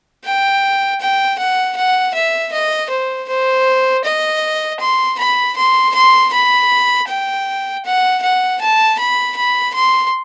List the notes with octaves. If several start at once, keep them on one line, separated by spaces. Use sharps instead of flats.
G5
G5
F#5
F#5
E5
D#5
C5
C5
D#5
C6
B5
C6
C6
B5
G5
F#5
F#5
A5
B5
B5
C6